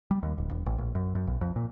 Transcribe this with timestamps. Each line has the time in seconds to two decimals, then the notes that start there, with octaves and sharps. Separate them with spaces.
0.11 G3
0.23 D#2
0.38 D1
0.51 E1
0.66 A1
0.78 A#1
0.95 F#2
1.15 F#2
1.27 B1
1.41 F2
1.56 A#2